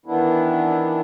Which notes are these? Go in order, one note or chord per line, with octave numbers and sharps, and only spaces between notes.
D#3 E3 B3 D4 E4